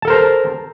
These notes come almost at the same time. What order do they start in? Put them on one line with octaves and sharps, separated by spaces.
A5 A4 A#4 C5 A#5